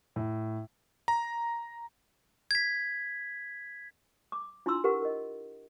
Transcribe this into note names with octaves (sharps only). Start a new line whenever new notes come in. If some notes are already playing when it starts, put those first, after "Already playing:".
A2
A#5
G#6 B6
D6
D4 E4 F4 A#5 C6 E6
G4 A#4 B4 F#5
A#4 D#5